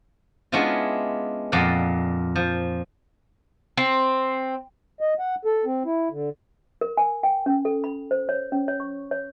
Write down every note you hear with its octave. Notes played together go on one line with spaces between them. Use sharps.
G#3 B3 C#4 D4 E4 F4
F2 A#2 D5 F5 F#5
F3
C4
D#5
F#5
A4
C4
E4
D3
A#4
G#5
G5
C#4
A4
B5
C5
C#5
C#4
C#5
C#6
C#5